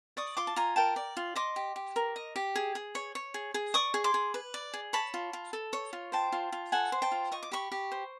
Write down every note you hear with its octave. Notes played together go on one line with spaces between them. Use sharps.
D5 C#6 D#6
F4 C6 D6
A5
F4 G#5 A#5
A#4 G5 A5
D5
F4
D#5 C6 D6
G4
G4
A#4
D#5
G4
G#4
G#4
C#5
C#5
G#4
G#4
D5 C#6 D#6
G#4
C6 D6
G#4
B4
D5
G#4
C#5 A5 B5
F4
F4
A4
C#5
F4
C5 G5 A5
F4
F4
A4 F#5 G#5
C5
G5 A5
F4
D#5 C#6
D6
G4 B5 C#6
G4
C5